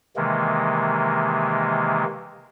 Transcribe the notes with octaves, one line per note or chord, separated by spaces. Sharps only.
C3 D#3 E3 G#3 A#3